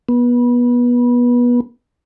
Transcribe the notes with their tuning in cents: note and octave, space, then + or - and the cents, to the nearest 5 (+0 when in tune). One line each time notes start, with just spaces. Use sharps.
B3 -25